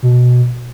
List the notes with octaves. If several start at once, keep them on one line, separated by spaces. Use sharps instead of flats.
B2